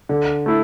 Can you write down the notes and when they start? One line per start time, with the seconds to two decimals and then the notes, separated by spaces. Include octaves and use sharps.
0.09 D3
0.46 A3 E4